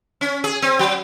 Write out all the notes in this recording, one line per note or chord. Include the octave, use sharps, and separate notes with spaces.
C#4
G#4
C4
F#3